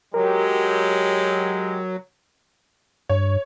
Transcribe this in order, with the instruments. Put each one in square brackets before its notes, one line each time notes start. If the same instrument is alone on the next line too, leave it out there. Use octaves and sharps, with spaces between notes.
[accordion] F#3 [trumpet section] G#3 G4 [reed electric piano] A#4
[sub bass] G2 [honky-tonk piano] C#5